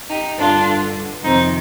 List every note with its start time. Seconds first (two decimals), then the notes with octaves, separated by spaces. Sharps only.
0.10 D#4 G4
0.38 G2 D3 D4 F4
1.24 F2 C3 D#3 C4 D#4